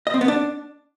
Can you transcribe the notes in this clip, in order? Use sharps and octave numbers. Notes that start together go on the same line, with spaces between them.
D#5
C4
B3
D4